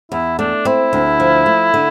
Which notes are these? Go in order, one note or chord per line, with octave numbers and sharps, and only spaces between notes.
E2 E4
A3 D4
C4 E4
D2
F3
A3
D3